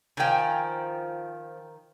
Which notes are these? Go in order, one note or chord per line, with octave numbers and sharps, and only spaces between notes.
D#3 F3 G5 G#5